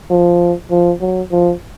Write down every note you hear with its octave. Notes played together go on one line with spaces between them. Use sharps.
F3
F3
F#3
F3